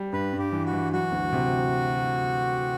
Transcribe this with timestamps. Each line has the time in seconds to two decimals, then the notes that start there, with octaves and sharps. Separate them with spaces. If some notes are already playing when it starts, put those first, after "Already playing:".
Already playing: G3
0.12 G2 B4
0.33 G2
0.39 G4
0.52 E3
0.66 F#4
0.73 E3
0.92 F#3 F#4
1.12 D2
1.32 C3